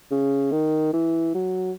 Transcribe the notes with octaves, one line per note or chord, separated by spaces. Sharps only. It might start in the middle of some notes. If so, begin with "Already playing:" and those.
C#3
D#3
E3
F#3